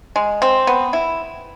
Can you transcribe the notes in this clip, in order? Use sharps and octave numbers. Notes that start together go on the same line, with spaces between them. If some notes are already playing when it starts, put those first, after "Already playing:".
G#3
C4
B3
E4